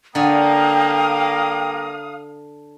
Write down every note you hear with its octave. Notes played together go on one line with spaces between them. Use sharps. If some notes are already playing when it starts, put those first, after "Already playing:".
D3 G3 A#3 C#5 F5 G5 A#5 D#6